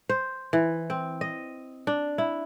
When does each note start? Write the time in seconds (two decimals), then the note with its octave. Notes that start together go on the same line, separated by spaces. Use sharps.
0.09 C5
0.53 E3
0.90 C4
1.21 D#5
1.87 D4
2.18 E4